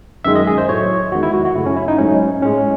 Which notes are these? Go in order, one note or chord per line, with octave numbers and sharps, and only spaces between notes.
F#2 D#3 G#3 E5
D#5
G#4
C5
A2 F#3 A3 C#5
E2 D#3 G#3 F#4
E4
F#4
F#4
F#2 C#3 F#3 A3 E4
C#4
E4
D#4
G#2 F#3 A3 C#4
A2 G#3 C#4